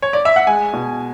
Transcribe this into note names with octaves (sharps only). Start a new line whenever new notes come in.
C#5
D5
E5
F#5
G#3 G#5
B2